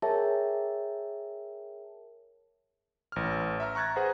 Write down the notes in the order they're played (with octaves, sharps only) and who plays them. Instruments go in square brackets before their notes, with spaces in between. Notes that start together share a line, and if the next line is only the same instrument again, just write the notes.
[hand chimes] G#4 A#4 C#5 E5 G5 A5
[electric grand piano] A1 F6
E5 A#5 F6
A#5 C#6 F#6 G#6 A6
G#4 B4 C5 F#5 A#5